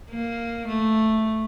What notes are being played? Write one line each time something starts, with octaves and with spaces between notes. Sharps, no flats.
A#3
A3